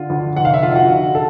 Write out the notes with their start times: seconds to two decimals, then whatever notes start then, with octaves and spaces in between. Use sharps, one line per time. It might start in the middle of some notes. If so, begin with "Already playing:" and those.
Already playing: D3 F4
0.10 D2
0.36 F1 F#5
0.45 F5
0.54 E5
0.62 D3 F4 F5
0.76 F#4 F#5
0.89 F1
1.15 A4